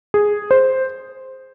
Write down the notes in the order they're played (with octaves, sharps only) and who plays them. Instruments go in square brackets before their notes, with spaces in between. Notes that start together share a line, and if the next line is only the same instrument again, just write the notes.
[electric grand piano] G#4
C5